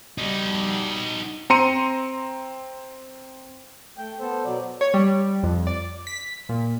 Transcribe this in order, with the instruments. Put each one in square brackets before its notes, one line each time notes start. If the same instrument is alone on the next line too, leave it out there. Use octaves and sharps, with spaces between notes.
[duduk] G3 [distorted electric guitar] D#4 F#4
[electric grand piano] C4 A#5 C6 C#7 D#7
[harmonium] A3 G5
B3 A4 C5
B2 F#3 D5
[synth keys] C#5
G3
F2
D5
B6
A#2